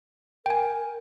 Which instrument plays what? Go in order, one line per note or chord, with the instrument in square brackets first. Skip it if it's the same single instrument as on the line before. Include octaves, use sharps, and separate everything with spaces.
[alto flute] A#4 [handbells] G5 G#5